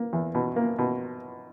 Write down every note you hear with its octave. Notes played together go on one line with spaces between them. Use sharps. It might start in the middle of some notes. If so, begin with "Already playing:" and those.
Already playing: A#3
E2
B2
A#3
B2